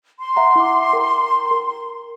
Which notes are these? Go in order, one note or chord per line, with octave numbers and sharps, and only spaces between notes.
C6
E5 F#5 A#5
E4 A#5 D6
A#4 G5 A#5
A#4